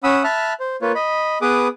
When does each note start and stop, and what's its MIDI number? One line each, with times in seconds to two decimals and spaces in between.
0.04 0.23 61
0.04 0.23 78
0.04 0.23 83
0.04 0.23 87
0.04 0.23 88
0.24 0.53 76
0.24 0.53 81
0.24 0.53 83
0.24 0.53 89
0.24 0.53 90
0.60 0.76 72
0.82 0.92 58
0.82 0.92 65
0.82 0.92 71
0.82 0.92 73
0.95 1.38 75
0.95 1.38 83
1.42 1.68 59
1.42 1.68 68
1.42 1.68 71
1.42 1.68 86
1.42 1.68 87